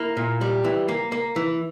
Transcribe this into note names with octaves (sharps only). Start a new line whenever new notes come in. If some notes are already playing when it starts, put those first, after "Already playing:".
Already playing: A#3 E4
A#2
G3
E3
A#3
A#3
E3